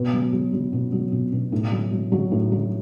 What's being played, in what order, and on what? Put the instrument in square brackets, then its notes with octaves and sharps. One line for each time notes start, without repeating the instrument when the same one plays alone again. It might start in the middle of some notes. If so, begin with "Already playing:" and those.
Already playing: [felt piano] B2 B4
F#3
F#3
F#3
B2
F#3
B2
B2
A2
F#3
F#3
F#3
A2
F#3